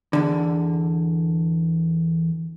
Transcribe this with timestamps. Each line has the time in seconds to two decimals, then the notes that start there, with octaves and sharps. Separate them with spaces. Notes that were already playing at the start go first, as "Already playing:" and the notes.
0.13 E2 D3